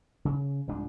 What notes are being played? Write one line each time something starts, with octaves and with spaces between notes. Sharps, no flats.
C#3
C2 G#2 F3 D4